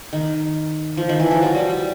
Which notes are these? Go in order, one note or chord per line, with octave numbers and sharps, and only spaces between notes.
D#3
F3
D#3
E3
F3
F#3
G3
G3